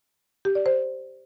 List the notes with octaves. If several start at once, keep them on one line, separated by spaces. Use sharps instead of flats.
G4
D5
C5